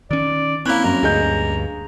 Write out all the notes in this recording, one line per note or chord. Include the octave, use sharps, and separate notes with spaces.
D#3 C#4 D5
A#3 C4 C#4 E4 F#6
F#2 A#5
D2 G2 G#4 D#5 G6